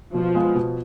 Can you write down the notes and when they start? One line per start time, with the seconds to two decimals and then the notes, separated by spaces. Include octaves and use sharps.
0.13 B2 F3
0.35 G#3 B3 F4
0.55 B2